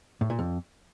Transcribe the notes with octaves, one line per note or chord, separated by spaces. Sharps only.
A2
A#2
F2